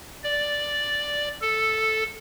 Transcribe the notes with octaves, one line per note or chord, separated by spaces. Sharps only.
D5
A4